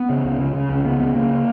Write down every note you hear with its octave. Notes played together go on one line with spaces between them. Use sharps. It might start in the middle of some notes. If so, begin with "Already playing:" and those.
Already playing: B3
C#3
C#2
C#3
C#3
C#2 C#4
C#3 B3
C#2 B3
C#3 A#3